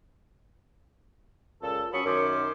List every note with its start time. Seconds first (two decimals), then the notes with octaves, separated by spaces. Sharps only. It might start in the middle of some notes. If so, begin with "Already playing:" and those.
1.62 C#2 A#2 A4
1.93 F#3 C#4 B5 C#6 D#6
2.05 F#2 D#3 C#4 C5 D6